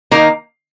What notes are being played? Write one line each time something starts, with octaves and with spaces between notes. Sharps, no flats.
D#3 A#3 D#4 A#4